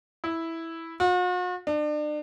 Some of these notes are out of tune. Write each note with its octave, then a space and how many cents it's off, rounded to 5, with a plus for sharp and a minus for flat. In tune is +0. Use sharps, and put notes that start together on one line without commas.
E4 -5
F#4 -45
D4 +35